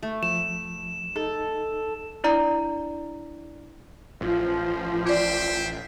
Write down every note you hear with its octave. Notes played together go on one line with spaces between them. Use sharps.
A3
F3 E7
D#4 A4
D4 E4 D5 A#5
A1 F3
F4 C5 D5 E5 G5